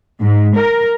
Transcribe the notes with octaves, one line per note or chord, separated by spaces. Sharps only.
G#2
A#4